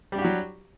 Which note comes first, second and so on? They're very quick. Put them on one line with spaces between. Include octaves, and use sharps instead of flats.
G3 D4 G4 F#4 F#3